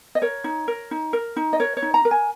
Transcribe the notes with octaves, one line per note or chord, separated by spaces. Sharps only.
D#5
A#4 C#5
D#4
A#4
D#4
A#4
D#4
D#5
A#4 C#5
C#5
D#4
A#5
A#4
G#5